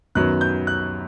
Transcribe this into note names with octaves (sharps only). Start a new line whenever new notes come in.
F#2 D#3 F#3 B3 F#6
G6
F#6